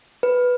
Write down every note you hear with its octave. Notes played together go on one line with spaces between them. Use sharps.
B4